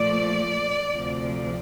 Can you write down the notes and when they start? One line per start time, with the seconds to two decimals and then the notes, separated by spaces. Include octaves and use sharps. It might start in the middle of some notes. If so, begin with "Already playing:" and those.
Already playing: A#2 F3 A3 D5
0.90 D2 C3 F3